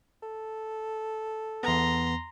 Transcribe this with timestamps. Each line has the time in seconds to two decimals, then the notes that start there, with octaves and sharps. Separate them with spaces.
0.22 A4
1.63 E2 B3 A#5 C6